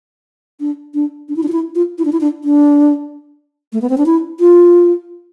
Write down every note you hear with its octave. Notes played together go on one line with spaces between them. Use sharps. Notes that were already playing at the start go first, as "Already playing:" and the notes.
D4
D4
D4
E4
D4
F4
E4
F4
E4
D4
E4
D4
D4
A3
B3
C4
D4
E4
F4